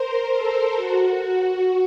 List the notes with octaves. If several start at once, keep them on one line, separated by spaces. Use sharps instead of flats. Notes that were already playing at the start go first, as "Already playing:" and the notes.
Already playing: A#4 C5
A4
F#4
F#4